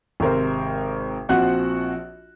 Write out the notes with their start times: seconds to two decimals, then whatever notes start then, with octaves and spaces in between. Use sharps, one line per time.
0.20 G#1 C3 A#4 C5
1.29 A#1 F3 C4 F#4 F#5 F#6